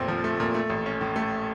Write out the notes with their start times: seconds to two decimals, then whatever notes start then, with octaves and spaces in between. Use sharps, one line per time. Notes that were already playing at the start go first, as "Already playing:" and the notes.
Already playing: F1 A#2 A3 C4
0.08 F3
0.24 A3
0.40 A#2
0.54 A3
0.70 A1
0.86 C#4
1.01 A2
1.16 A3